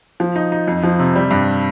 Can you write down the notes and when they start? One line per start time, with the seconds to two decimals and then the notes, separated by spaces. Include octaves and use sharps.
0.20 F3
0.36 D#4
0.52 D#4
0.68 F2
0.83 F3
0.99 C3
1.16 G3
1.31 G2